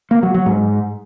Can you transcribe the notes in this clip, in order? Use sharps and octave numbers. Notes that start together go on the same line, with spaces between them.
A#3
F#3
F#3
G#2